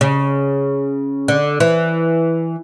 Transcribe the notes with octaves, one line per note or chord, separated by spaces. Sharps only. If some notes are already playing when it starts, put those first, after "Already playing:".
C#3
D3
E3